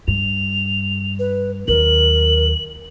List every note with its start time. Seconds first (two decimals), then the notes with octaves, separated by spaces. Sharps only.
0.08 G2 F7
1.19 B4
1.68 D#2 F#3 A#4 F#7